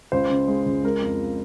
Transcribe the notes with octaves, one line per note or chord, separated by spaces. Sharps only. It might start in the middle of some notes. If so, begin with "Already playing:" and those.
C#2 C5
C#3
G#3
C#2
G#3 A#4
F2